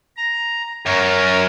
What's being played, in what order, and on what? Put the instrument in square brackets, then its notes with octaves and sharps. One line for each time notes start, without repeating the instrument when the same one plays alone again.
[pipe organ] A#5
[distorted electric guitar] F#2 [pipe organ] A#4 C#5 G#6